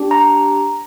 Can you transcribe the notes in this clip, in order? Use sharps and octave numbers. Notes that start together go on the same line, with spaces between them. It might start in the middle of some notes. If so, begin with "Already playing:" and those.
Already playing: D4 G4
A#5